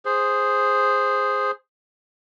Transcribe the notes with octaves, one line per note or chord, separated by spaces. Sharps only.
G#4 C5